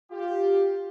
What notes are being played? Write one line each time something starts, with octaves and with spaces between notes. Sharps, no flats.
F4 G4